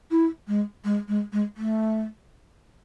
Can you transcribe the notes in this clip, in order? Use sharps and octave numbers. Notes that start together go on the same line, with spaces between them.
E4
G#3
G#3
G#3
G#3
A3